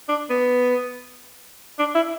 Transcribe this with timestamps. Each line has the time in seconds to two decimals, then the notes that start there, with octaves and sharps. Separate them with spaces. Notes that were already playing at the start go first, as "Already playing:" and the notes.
0.09 D4
0.30 B3
1.79 D4
1.95 E4